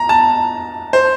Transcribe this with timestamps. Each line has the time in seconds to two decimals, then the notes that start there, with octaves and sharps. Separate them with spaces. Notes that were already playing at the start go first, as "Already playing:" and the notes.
Already playing: A#5
0.09 A5
0.93 C5